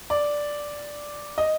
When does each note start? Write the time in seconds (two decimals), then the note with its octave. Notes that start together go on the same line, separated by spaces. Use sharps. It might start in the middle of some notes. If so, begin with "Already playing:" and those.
0.10 D5
1.38 D#5